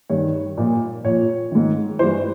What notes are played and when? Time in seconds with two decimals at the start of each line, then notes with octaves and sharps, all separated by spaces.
0.09 G2 D#3 C#5
0.57 A#2 F3
1.04 A#2 C#5
1.10 F3
1.52 G#2 D#3
1.99 G2 E3 C5